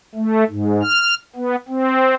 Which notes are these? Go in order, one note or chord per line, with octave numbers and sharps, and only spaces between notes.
A3
G#2
F6
B3
C4